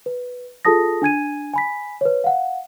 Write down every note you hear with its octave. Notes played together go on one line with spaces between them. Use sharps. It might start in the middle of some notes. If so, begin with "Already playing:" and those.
B4
F4 G#4 A4 A5 D#6 A#6
D4 G#5 G#6 D#7
G#5 B5 B6
B4 C#5
F5 F#5